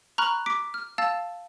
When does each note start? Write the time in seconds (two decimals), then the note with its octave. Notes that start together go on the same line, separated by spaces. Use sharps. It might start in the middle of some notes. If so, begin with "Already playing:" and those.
0.18 A#5 B5 C#6 F6 F#6
0.46 D6 B6 D7
0.74 F6
0.98 F5 A5 E6 A6